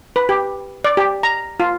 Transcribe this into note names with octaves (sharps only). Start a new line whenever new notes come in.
B4
G4
D5
G4
A#5
F4